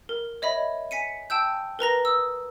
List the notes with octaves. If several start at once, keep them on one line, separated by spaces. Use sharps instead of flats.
A#4
C#5 D#5 E5 B5
G#5 B6 C#7 D#7
G5 A5 E6 G6
A#4 B4 A#5 A#6
D#6 E6